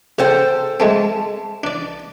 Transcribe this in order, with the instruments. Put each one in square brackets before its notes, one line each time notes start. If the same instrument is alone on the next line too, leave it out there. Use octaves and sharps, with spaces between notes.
[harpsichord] C#3 [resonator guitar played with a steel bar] A4 C5 G5
[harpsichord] G#3 A3 C4 [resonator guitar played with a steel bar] A5
[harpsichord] D4 D5